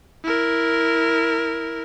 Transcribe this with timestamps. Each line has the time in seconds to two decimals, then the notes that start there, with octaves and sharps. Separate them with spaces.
0.24 E4 A#4